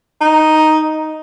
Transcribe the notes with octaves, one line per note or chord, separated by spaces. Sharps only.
D#4